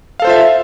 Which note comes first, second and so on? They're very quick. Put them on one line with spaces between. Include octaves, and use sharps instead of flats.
F5 A4 C5 F4 E5